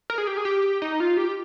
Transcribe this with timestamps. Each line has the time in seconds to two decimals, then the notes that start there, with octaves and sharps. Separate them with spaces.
0.10 A#4
0.18 G#4
0.27 G4
0.37 G#4
0.45 G4
0.82 D#4
1.00 F4
1.17 G4